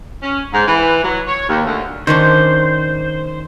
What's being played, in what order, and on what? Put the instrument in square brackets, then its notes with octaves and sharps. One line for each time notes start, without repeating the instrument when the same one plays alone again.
[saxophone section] C#4
G#2
E3
F#3
C#5
D#2
D2
[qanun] D#3 C#4 D4 [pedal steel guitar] C5